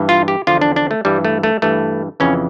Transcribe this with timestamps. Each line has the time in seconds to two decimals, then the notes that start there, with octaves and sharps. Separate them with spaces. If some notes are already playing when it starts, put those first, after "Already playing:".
Already playing: G2 E3
0.09 F4
0.28 G4
0.47 E2 D3 F3 F4
0.61 D4
0.76 D4
0.91 A3
1.05 G2 E3 G3
1.25 A3
1.43 A3
1.62 G2 E3 A3
2.20 F2 C#3 E3 C#4